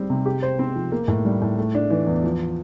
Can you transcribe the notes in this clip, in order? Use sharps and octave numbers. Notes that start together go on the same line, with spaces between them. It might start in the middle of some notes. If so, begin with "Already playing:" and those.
Already playing: G3 C4 G4
C3
G4
C5
C4
F3
A#3
A2
G3
A2
A3
D4
E3
E2
F3